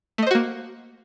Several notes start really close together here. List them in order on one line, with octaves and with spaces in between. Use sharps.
A3 D#5 C5 F#4 A#3